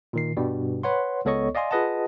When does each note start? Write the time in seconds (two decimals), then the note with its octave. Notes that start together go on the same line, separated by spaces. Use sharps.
0.13 A#2 D#3 C7
0.37 G2 B2 G3
0.83 B4 C#5 F#5 C6
1.25 C#2 B3 A4 C#5 D#5 C#6
1.55 D5 D#5 F5 G#5 C6
1.71 F4 G#4 B4 D#5 F#5 A5